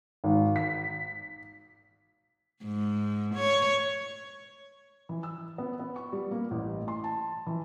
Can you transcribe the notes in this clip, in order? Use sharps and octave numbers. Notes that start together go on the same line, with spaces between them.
G#1
B6
G#2
C#5
E3
E6
B3
B3
C#6
G3
A#3
A1
C6
A5
E3